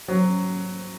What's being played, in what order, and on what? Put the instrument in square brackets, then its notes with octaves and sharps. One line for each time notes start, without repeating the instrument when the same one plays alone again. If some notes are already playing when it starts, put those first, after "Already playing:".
[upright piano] F#3